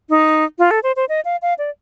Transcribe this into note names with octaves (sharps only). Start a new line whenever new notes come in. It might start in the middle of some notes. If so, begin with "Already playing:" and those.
D#4
F4
A4
C5
C5
D#5
F5
F5
D5